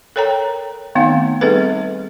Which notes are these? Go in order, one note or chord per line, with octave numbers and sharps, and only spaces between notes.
A4 A#4 C#5 G5 A#5
D#3 A3 B3 C4 D#4 F5
G3 C4 D#4 G#4 A4 B4